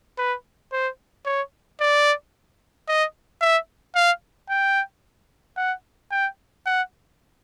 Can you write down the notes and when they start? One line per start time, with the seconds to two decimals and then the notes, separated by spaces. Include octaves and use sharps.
0.18 B4
0.72 C5
1.25 C#5
1.81 D5
2.88 D#5
3.41 E5
3.95 F5
4.49 G5
5.57 F#5
6.11 G5
6.66 F#5